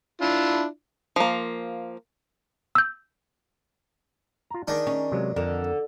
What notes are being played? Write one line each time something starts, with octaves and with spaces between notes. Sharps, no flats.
D4 E4 F4
F3 A#3
E6 G6
F4 A#5
D#3 D4 D#4 G#4
C#4
C3 F#3 G#3
F2 D3 A#4